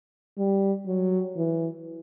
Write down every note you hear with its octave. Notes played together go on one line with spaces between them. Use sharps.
G3
F#3
E3